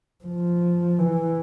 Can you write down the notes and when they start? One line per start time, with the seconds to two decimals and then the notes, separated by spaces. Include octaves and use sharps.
0.25 F3
0.99 E3